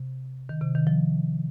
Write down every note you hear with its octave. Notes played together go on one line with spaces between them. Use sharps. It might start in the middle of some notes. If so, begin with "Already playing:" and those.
Already playing: C3
D#3
C3
D#3
F3